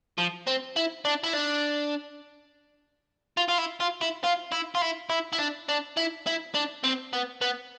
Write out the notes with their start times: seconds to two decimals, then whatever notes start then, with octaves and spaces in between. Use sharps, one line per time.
0.18 F3
0.47 C4
0.76 E4
1.05 D4
1.24 E4
1.34 D4
3.37 F4
3.48 F4
3.58 E4
3.80 F4
4.01 E4
4.24 F4
4.52 E4
4.75 F4
4.82 E4
5.10 E4
5.33 E4
5.39 D4
5.69 D4
5.97 E4
6.26 E4
6.54 D4
6.84 C4
7.13 B3
7.41 B3